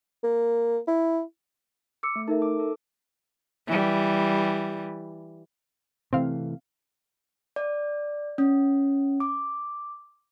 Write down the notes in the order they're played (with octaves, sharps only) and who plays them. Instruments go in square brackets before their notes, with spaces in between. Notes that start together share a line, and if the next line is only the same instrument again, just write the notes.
[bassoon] A#3
E4
[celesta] D6 E6 C#7
[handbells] A3
[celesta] D#4 A#4 E5 [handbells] A4
[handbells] D6
A4
[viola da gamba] E3 G3
[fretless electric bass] C3 E3 A3 [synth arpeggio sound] C4 F5
[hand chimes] D5
C#4
D6